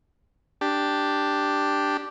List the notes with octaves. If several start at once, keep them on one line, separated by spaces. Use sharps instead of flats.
D4 G4